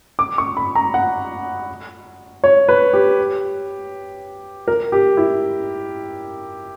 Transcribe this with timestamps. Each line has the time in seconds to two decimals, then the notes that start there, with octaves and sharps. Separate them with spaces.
0.19 D6
0.38 C#6
0.57 B5
0.75 A#5
0.94 F#5
2.44 C#5
2.68 B4
2.93 G4
4.68 A#4
4.92 G4
5.17 E4